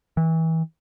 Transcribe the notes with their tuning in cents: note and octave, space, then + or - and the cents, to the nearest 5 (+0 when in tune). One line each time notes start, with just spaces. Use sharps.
E3 -25